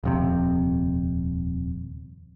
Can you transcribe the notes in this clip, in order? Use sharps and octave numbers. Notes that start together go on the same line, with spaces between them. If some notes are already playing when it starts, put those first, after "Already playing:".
D#1 F2 C3